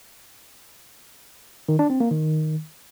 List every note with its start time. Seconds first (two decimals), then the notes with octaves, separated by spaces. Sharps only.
1.69 D#3
1.79 D4
1.90 C4
2.00 A#3
2.11 D#3